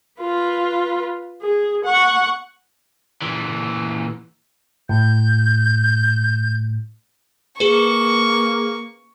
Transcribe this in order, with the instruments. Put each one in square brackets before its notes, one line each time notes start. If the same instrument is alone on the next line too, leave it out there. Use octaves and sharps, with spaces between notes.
[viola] F4 B4
G#4
F#5 C#6
[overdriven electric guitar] A#2 E3
[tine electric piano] A2 [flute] G6
[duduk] A#3 [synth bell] G#4 B4 [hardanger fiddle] C#6